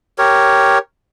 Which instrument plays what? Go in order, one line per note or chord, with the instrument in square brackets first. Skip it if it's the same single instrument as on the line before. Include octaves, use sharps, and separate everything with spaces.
[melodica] G4 A#4 C#5